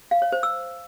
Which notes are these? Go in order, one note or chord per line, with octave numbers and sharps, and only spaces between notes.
F5
C#5
C5
E6